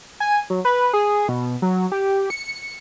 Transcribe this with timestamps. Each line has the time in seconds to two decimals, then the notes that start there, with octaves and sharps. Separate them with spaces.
0.20 G#5
0.50 F#3
0.65 B4
0.93 G#4
1.28 B2
1.62 F#3
1.92 G4
2.30 C#7